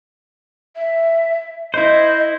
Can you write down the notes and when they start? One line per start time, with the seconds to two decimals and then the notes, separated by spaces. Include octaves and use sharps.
0.76 E5
1.74 E4 C5 D#5